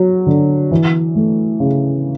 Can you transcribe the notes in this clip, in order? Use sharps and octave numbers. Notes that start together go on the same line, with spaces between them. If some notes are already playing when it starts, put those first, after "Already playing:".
Already playing: F#3
D3
E3
A3
C#3